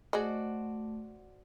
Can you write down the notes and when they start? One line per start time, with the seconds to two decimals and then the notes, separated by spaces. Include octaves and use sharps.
0.13 A3 F#4 G#4 C5 D5 D#5